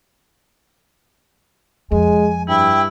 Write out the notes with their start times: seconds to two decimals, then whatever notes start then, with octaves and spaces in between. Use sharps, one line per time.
1.92 F2 G#3 G#5
2.48 G2 E4 G5